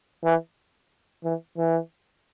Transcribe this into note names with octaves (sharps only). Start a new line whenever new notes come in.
E3
E3
E3